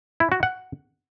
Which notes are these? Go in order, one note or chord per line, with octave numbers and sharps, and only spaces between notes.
E4
F#4
F#5